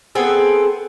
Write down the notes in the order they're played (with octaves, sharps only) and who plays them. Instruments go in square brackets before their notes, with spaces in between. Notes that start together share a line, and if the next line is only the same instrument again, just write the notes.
[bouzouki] B3 C4 G#4 A4